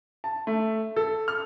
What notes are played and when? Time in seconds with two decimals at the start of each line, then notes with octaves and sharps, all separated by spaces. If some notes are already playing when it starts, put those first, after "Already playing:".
0.24 A5
0.47 A3
0.96 A4
1.28 F6